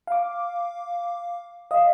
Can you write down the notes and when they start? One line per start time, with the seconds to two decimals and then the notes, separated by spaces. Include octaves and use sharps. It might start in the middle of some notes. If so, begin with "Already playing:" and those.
0.07 F5 D6
1.71 D#5 F5